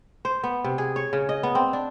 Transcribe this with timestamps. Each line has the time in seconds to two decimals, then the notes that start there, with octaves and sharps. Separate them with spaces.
0.25 C5
0.44 B3
0.64 C3
0.78 G#4
0.96 C#5
1.13 C#3
1.29 D#5
1.43 B3
1.55 C4
1.73 D4